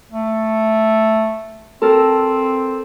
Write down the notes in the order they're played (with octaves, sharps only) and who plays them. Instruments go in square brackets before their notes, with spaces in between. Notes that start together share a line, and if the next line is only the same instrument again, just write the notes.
[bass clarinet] A3
[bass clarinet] C4 [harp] A4 A#4